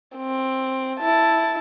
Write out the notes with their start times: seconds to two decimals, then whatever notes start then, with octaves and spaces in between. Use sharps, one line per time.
0.16 C4
0.99 E4 A5